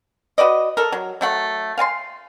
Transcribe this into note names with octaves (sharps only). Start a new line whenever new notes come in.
F#4 B4 D5 D#5
A4 A#4
F#3
F#3 A3 F#5
F5 G#5 A5 C6